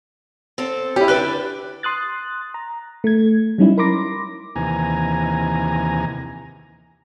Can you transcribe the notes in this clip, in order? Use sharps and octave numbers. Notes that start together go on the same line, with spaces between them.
C4 A4
C#4 E4 G4
D3 D4 B4 F#6
C6 D#6 F#6 A6
A#5
A3 G#6
F#3 G3 C#4 D#4 E4
A#4 B5 C6 D6 A#6
D#2 C3 E3 G#5 A#5